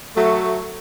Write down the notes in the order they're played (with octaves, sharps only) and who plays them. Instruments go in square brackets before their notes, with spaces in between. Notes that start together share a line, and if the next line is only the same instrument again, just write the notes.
[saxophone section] F#3 A3